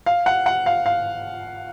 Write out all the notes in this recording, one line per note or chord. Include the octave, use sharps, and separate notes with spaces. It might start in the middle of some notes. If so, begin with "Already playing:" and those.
F5
F#5
F#5
F5
F5